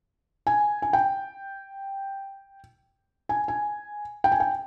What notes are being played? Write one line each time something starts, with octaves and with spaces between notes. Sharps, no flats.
G#5
G#5
G5
G#5
G#5
G5
G#5
G5